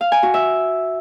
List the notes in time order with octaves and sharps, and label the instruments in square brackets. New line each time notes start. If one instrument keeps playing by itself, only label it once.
[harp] F5
G#5
F#4
E5